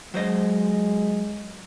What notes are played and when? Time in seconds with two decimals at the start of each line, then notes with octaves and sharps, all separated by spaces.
0.14 F#3 G#3 C5 D#5